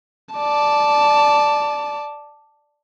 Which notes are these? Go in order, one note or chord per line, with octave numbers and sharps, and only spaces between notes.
D5 A5